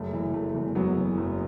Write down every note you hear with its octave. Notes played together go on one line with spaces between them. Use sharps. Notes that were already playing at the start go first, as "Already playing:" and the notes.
Already playing: F#1 A3
E3
F#1 A3
E2
F#1 F#3 B3
E3
F#1